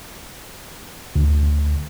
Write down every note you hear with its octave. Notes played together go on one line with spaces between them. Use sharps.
D2